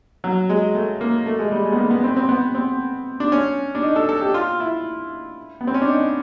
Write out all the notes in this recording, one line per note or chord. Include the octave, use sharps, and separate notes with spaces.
F#3
G#3
A3
A#3
A3
G#3
G3
G#3
B3
A#3
B3
C4
C4
B3
C4
D4
C#4
D4
D#4
A4
A4
G4
F4
E4
B3
C4
C#4
D4
D#4